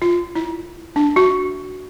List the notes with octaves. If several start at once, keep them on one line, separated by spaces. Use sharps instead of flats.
F4
E4
D4
F#4